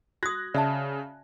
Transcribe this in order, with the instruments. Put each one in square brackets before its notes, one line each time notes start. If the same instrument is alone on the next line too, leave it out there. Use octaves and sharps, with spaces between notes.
[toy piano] F#4 D#6 [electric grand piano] F#6 G#6 A#6
[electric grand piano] C#3 [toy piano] D5 E5 A5